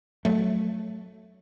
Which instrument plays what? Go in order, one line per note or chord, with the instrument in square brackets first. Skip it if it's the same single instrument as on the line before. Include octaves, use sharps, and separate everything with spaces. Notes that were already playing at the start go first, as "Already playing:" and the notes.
[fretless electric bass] F#3 A3